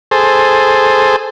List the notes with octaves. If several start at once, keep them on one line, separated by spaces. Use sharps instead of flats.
G#4 A4 C5